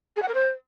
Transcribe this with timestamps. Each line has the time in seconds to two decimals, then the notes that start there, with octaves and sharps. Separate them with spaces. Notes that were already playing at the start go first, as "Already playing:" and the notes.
0.16 G#4
0.22 F#5
0.28 A#4
0.34 C5